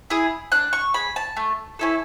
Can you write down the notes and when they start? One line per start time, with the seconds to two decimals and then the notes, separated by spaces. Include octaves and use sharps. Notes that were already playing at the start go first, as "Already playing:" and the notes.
0.10 E4 G#4
0.52 D4 F#6
0.73 C#6
0.94 G#4 B5
1.16 A5
1.37 A3
1.79 C#4 E4 A4